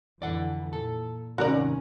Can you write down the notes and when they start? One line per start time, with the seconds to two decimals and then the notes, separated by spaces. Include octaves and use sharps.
0.22 F2 D3 E3 D5 F#5
0.73 A#2 A4
1.38 D#2 G#2 C3 C#4 F#4 A#4 D5